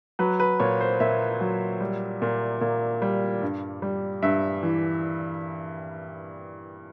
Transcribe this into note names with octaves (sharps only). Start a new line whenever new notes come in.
F#3 B4
B4
A#2 C#5
C5
A#2 E5
F#3
G3
A#2
A#2
G3
G2
G3
G2 E5
E3